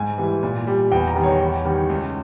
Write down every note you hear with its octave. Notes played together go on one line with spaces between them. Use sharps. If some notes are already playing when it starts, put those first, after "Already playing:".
Already playing: G#2 G#5
E3 G3
A#2
G3
E2 G5
A#5
D#3 G3
C#5
E2
D#3 G3
C#2